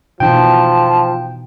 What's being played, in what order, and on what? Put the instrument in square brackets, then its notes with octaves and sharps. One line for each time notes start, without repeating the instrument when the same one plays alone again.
[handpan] B2 E3 D#4 [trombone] F3 [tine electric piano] G5 [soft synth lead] A5